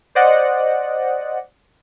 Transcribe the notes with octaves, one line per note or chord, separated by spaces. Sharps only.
C5 D5 D#5 F#5